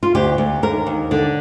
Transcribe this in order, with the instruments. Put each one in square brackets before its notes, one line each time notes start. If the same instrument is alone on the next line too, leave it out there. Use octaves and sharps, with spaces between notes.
[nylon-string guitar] F4
D2 G4
D2
D#2 A#4
D#2
D3 D5